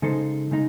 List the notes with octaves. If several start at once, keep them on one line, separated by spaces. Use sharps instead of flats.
C#3 G#3 D#4 A4 C5
C#3 G#3 D#4